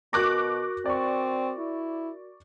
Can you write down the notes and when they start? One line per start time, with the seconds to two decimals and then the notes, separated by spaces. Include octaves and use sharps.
0.13 B2 F#4 A#4 C#6 D6 F#6 A#6
0.86 C4 D5 C#6
1.58 E4